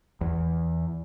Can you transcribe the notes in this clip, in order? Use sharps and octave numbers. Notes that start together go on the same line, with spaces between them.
E2